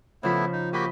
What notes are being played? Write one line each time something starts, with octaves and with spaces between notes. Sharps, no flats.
C#3 F3 A3 B3 E4 B5
D#4
A#3 F#4 G4 D#5 B5 G6